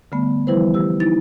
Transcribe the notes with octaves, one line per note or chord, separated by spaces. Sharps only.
D3 G3 A3 B3
E3 F3 G3 E4 B4 C5
G4 E6
D#4 E4 A6